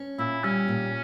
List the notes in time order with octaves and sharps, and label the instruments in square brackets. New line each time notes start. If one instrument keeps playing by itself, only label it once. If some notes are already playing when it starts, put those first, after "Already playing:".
Already playing: [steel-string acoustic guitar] C#4
[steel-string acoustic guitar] A#2 [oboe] E4
[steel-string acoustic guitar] G3 [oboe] C#4
[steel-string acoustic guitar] A#2